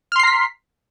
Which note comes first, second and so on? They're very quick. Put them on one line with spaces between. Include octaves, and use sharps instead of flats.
F6 C6 C7 A#5 B6